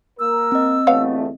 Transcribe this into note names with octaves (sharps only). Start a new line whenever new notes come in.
A#3 A#4 E6
C4 D#5
G1 E2 A3 B3 C#5 F5